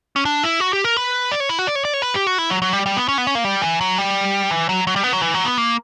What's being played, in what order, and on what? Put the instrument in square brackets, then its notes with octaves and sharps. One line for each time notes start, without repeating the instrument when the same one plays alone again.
[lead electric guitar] C#4
D4
E4
F#4
G4
A#4
B4
D5
C#5
E4
F#4
D5
C#5
D5
C#5
B4
G4
F#4
E4
F#3
F#3
G3
G3
B3
C#4
B3
C#4
A#3
G3
E3
F#3
G3
E3
F#3
F#3
G3
B3
F#3
E3
F#3
B3
A#3